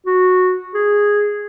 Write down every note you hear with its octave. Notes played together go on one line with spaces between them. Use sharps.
F#4
G#4